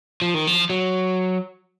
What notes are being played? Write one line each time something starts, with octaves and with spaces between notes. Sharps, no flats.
F3
D#3
F3
F#3